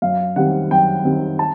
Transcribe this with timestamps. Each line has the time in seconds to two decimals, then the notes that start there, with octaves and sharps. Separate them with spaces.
0.02 F#2 F5
0.36 D#3 G3 C4 F#5
0.71 F#2 G5
1.05 D#3 G3 C4
1.39 A5